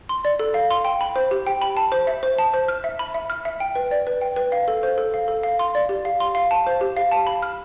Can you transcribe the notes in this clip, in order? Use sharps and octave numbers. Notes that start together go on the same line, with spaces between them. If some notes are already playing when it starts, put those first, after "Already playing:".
C6
D5
A4
F5
C6
G5
B5
C5
G4
G5
B5
A5
C5
E5
C5
A5
C5
F6
E5
B5
E5
F6
E5
G5
B4
D5
B4
G5
B4
F5
A4
C5
A4
F5
A4
F5
C6
D5
G4
F5
C6
F5
A5
C5
G4
F5
A5
B5
F6